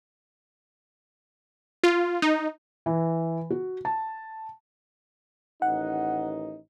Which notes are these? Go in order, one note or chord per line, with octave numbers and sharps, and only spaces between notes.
F4
D#4
E3
F#4
A5
A1 D#3 D#4 F#5